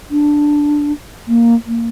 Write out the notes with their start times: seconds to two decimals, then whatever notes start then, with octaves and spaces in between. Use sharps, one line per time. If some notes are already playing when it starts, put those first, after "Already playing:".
0.11 D4
1.28 A#3
1.66 A#3